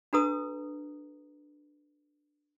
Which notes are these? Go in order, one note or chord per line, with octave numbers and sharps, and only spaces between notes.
D4 F#4 A4 B4 A#5 D#6